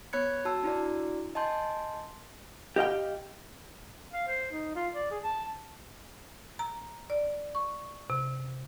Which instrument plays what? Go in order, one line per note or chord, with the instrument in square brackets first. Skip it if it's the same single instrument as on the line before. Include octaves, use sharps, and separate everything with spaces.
[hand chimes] B3 C#5 B5 F#6 G#6 C#7
F#4 A5 E6
D4 E4 F#4 D5
D#5 G#5 A5 C6 G6
[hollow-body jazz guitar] G4 D#5 F5 G5
[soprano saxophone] F5
C5
D#4
F4
D5
G#4
A5
[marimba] A#5
D5
C#6
C3